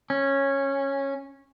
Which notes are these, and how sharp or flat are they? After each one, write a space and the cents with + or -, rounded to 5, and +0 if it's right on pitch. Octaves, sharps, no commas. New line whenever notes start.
C#4 -10